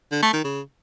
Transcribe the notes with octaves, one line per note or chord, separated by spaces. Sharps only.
D3
A3
D#3
C#3